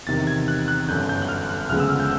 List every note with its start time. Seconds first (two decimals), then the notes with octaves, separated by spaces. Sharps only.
0.07 E2 C3 D#3 A6
0.27 G#6
0.48 F#6
0.68 F#6
0.88 G1 F#2 D3 G6
1.09 G6
1.22 F#6
1.29 F6
1.49 F#6
1.69 D2 C#3 F3 G#3 B3 F6
1.80 E6
1.90 F6
2.00 G6